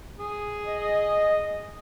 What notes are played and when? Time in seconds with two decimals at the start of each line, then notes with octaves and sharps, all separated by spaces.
0.19 G#4
0.67 D#5